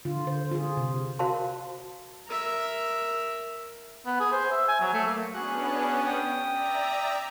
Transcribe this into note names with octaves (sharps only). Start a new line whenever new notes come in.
D3 F4
D3 C5
F4 G#4
C3
F#4 A#4 C5 F5 A5 C6
A#4 E5
B3
G#4
C5
E5
G#5
F#3
A3
A#3
B3 C#4 D4 F#4 G#4 F#6
G5 D#6
D5 E5 A#5